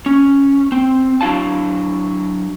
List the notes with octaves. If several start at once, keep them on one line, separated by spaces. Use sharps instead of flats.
C#4
C4
F#3 D4 E4 F5 A5